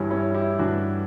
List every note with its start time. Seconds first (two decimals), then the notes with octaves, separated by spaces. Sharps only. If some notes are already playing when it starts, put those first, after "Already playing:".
Already playing: G2 E3 G3 C#4 E4
0.10 C#4 E4
0.34 E4 G4
0.59 G2 E3 G3 D4 F#4